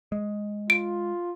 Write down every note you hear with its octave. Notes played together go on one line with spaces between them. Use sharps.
G#3
F4 D7